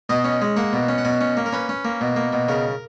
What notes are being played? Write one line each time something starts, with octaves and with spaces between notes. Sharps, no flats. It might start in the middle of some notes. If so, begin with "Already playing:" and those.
B2 D#5
C#4
G#3
A#3 F#5
B2
C#4
F#5
B2 G#5
C#4
A#3
A#4
C#4 B4
C#4
A#3
B2
A#3
B2
C#3 A#4